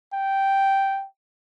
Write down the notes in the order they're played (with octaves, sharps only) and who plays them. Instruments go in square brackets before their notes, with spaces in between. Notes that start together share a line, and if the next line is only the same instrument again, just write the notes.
[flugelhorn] G5